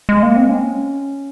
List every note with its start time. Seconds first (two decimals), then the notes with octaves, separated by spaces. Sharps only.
0.09 G#3
0.23 A#3
0.36 C4
0.49 C#4